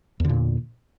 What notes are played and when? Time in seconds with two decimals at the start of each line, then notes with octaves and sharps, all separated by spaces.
0.20 E2
0.25 D3
0.29 A#2